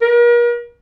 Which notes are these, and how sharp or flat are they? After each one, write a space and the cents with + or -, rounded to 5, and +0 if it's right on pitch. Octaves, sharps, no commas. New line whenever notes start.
A#4 +40